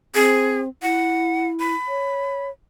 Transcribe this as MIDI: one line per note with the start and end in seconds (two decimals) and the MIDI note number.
0.15 0.68 60
0.15 0.60 68
0.82 1.74 64
0.82 1.47 78
1.60 2.47 83
1.88 2.50 73